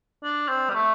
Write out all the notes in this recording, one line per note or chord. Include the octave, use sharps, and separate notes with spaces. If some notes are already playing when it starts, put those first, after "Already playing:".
D4
C4
G3
A3